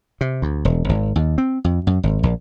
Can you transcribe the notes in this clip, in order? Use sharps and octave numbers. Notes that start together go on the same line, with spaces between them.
C3
D2
E1
G#1
D#2
C4
F2
F#2
G#1
A#1